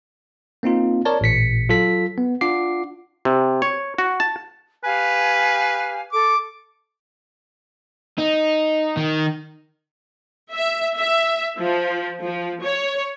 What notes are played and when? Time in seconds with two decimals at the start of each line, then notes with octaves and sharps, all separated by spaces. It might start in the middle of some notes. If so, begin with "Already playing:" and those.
0.63 A#3 C4 D#4 F4
1.05 A#4 C#5 D5 A5
1.21 A1 A#2 B6 C#7
1.69 F#3 F4 A4 B6
2.18 B3
2.41 D4 F4 F#5 D6 C7
3.25 C3
3.62 C#5
3.98 F#4
4.20 A5
4.84 G4 B4 F5 G#5
6.12 A4 D6
8.18 D#4
8.97 D#3
10.53 E5
10.96 E5
11.60 F3
12.21 F3
12.62 C#5